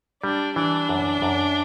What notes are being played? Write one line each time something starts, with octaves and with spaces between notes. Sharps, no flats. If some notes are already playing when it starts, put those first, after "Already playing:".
G3 D4
E3 D4
F#2
F#2